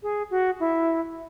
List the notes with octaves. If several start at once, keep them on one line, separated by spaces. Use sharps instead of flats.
G#4
F#4
E4